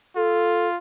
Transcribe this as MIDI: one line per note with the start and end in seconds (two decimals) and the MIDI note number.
0.16 0.78 65
0.16 0.68 69